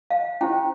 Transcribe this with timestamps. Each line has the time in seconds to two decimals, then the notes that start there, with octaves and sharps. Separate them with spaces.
0.10 F5
0.41 C#4 E4 G4 C5 G5